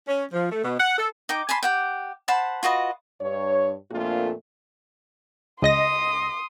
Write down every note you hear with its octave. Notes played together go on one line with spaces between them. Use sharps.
C#4
F3
A3
B2
F#5
A4
D#4 G5 D6
G#5 A5 B5 C6
G4 F#5 G5
C5 F#5 A5 B5
F4 F#4 B4 D#5
G2 C#5
F2 A#2 A3 A#3 D4 F4
C#2 D#5 C6 D#6 A#6